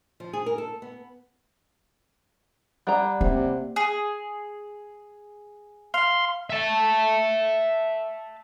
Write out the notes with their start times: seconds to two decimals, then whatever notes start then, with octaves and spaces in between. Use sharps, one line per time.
0.20 F3
0.33 G#4
0.46 A#4
0.58 A4
0.82 B3
2.87 G3 D5 F#5 A#5 F#6
3.21 C3 A#3
3.76 G#4
5.94 F5 C6
6.50 E5 A5